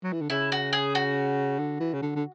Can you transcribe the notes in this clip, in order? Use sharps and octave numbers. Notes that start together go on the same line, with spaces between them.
F#3
E3
D3
C#3 E4
F#4
G#4
F#4
D3
E3
C#3
D3
D3